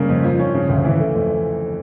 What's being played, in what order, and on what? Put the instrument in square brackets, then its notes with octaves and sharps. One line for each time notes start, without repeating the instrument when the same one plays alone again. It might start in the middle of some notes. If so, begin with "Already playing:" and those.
Already playing: [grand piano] C#3 G3 A#3
F2
F3
C#4
C#3
D2
E3
A3
F2